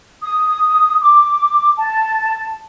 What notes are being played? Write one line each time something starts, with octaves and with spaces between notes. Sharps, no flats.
D#6
D6
A5